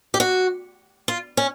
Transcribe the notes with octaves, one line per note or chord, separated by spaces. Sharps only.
G4
F#4
F4
C#4